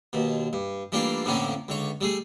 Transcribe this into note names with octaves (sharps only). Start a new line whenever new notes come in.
D#2 B2
G2
E3 G3 A3 A#3 D4 F4
F2 A2 D3 A#3 B3 C#4
C#2 D3 C#5
G3 A3 G#4